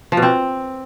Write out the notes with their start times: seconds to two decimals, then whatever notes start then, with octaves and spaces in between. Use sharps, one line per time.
0.12 F3
0.17 B2
0.22 C4